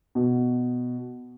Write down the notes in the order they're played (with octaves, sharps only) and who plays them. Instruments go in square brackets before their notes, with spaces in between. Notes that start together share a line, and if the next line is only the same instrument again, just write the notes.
[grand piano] B2